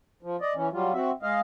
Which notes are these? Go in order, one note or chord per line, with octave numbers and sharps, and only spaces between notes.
F3
D5 D#5
E3 C#4
F#3 G3 F4
C4 F#4 E5
G#3 D#5 F5